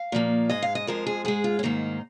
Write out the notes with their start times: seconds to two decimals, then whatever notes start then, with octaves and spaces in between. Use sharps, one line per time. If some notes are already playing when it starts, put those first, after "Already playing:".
Already playing: F5
0.12 A#2 F3 A#3
0.50 G#2 G#3 D#5
0.62 F5
0.75 D#5
0.87 F2 F3 G#3 A#4
1.07 G#4
1.25 G#2 G#3 G#4
1.44 F4
1.59 C#4
1.63 G#2 D#3 A#3 D#4